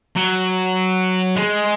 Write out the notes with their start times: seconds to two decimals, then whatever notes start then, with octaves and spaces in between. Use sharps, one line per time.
0.16 F#3
1.36 G#3